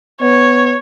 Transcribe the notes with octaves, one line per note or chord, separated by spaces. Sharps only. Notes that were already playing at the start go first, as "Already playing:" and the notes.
B3 C#5